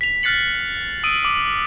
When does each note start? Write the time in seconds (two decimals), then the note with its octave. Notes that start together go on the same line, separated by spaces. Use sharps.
0.01 B6 F7
0.23 F6 F#6 A6 C7 C#7 F#7
1.04 D#6 E6 D7 D#7
1.25 D6